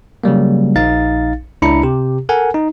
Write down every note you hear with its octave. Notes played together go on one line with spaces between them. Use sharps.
C#3 F#3 G3 A#3
A#1 D#4 F5 A6
C#2 D4 E4 A#5 B5 C#7
C3 G4
A4 A#4 F#5 G#5
D#4